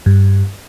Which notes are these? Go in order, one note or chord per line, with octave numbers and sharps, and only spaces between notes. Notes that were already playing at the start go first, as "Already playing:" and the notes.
G2